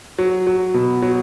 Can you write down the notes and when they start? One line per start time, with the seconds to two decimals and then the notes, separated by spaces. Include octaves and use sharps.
0.18 F#3
0.47 F#3
0.74 B2
1.02 F#3